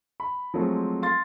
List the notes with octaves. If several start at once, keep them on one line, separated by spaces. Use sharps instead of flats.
B5
F3 F#3 G#3 A3 C4 C5
F5 C6 A6